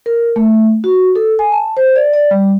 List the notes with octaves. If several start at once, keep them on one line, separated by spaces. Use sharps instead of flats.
A#4
A3
F#4
A4
G#5
A5
C5
D5
D5
G3